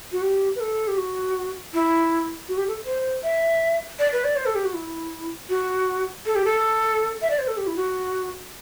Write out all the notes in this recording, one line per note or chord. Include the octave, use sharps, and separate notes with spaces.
F#4
G4
B4
A4
G4
F#4
E4
F#4
G4
A4
C5
E5
D5
B4
D5
C5
A4
G4
F#4
E4
F#4
A4
G4
A4
E5
D5
C5
A4
G4
E4
F#4